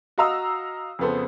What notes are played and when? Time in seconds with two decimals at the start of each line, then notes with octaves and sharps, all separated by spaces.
0.18 F#4 D#5 F5 A#5 D#6 E6
0.99 F2 C#3 B3 A4 C5